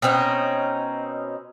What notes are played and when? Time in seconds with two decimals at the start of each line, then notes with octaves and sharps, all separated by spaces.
0.02 B2 C4 C#4 D#4